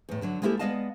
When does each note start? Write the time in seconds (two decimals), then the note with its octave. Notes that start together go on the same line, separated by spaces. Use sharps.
0.09 E2 A2
0.22 D3 F#3 D4
0.42 G#3 A#3 B3 E4 G4 A4
0.59 G#3 B3 D5 D#5 F5 A5